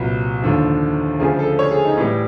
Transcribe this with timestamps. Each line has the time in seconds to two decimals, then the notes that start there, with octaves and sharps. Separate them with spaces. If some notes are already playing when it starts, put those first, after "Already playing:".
Already playing: C2 A#2 F#3 B4
0.43 D#2 D3 F3
1.20 D2 C#3 F3 G#4
1.39 A4
1.59 C#5
1.71 G#4
1.85 D#4
1.97 A2 E3 G3